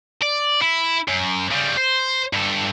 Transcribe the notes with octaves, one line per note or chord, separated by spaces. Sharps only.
D5
E4
F#2
C#3 G3
C5
G2 A4